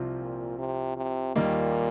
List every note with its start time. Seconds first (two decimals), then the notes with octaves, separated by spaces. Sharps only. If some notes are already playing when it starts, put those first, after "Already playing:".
Already playing: C2 C3 F3 C4 F4
0.21 A#2
0.58 C3
0.97 C3
1.35 D#2 A#2 D#3 G3 A#3 D#4